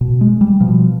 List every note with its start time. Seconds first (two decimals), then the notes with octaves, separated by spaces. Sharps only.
0.01 B2
0.21 G#3
0.41 G3
0.61 B2 F3